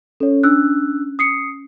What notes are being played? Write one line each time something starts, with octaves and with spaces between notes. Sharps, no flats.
C#4 A4 C#5
D4 E6 F#6
D#6 C7 C#7